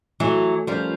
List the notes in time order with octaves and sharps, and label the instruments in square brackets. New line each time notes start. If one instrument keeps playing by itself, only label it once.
[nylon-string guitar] E3 F#3 [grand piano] A3
[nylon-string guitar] F3 G3 [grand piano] C#4 F4 A#4 C#5